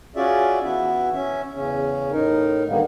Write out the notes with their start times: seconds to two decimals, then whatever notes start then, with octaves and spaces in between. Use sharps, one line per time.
0.16 C#4 F4 F#4 G#4 D5 E5
0.64 E3 B3 E4 F#4 E5
1.14 C#4 E5
1.55 E2 C#3 C#4
2.12 A2 D#4 A#4
2.68 D3 D#3 G3 A#3 B3